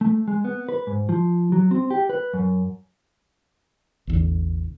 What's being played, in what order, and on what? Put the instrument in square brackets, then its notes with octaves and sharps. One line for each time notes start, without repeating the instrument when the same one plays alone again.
[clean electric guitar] A3
G#3
B3
B4
G#2
F3
F#3
C4
G4
B4
F#2
[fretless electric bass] A1 E2 D3